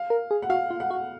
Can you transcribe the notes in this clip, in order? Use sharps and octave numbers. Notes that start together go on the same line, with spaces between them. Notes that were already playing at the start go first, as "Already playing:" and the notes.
Already playing: F5
A#4
G#4
F#5
F#4 F5
F4
F#5
F#4